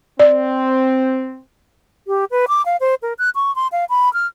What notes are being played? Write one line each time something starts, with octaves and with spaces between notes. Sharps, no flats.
C4 D5
G4
B4
D6
F5
C5
A#4
F#6
C#6
C6
F5
B5
F6